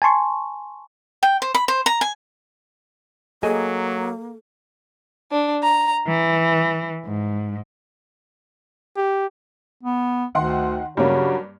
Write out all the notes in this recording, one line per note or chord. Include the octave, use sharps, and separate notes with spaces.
G#5 A5 C6 C#6
G5
C5
B5
C5
A#5
G#5
F#3 A#3 G#4 A4 D#5 G#5
D4
A#5
E3
G#2
G4
B3
D2 D#3 F#5 C6
G2 C#3 F#3 A#3 C#4